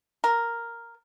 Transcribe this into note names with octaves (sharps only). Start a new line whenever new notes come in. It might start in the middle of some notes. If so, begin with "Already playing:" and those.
A#4